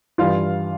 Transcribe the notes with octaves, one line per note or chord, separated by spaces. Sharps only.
G2 E3 G3 F4 F5